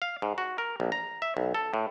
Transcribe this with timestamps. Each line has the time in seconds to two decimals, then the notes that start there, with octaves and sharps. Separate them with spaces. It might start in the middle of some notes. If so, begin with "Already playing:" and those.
0.02 F5
0.22 G#2
0.38 F#4
0.58 A#4
0.80 A#1
0.92 A#5
1.22 E5
1.37 B1
1.55 A4
1.74 A2